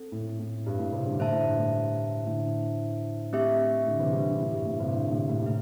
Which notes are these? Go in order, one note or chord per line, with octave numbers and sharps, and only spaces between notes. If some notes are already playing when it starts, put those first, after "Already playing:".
Already playing: C4 A4
A2
A2
G2
A2
G2 C3
D3 G3
A2 D3 E4 C5 E5 A5
A2
G2
A2
A2 D3
A3 C4 G4 E5
A2 D3
C3 E3
D3 G3
D3 G3
A2
G2
A2
G2 C3
A2 D3
A2 D3
A2 D3
C3
A2 E4